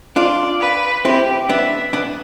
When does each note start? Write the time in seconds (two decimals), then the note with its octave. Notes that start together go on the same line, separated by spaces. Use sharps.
0.16 D4 F4 D5
0.61 B4
1.05 C4 E4 G4
1.49 B3 D4 E5
1.93 B3 D4